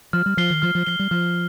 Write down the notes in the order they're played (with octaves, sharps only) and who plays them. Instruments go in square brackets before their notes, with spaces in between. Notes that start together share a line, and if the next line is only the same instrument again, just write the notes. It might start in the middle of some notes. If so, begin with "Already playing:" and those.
[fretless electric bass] F3 [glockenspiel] F6
[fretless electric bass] G3
[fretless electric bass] F3 [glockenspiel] C7 G7
[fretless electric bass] D#3
[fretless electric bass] F3 [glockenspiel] F6
[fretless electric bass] F3
[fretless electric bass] F3 [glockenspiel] C7 G7
[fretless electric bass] G3
[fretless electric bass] F3 [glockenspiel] F6